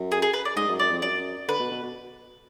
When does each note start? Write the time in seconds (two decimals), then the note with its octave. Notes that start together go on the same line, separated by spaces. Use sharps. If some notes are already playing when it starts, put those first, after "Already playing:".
Already playing: F#2
0.12 G#4
0.22 G#4
0.33 B4
0.45 D5
0.56 G#2 D#5
0.68 F#2
0.79 F#2 D5
0.91 F2
1.02 F#2 D5
1.48 D3 B4
1.60 B2
1.71 B2
1.83 B2